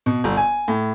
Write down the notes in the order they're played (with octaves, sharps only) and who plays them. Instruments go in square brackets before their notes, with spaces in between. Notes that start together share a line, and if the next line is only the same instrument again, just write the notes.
[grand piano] B2
G1
G#5
A2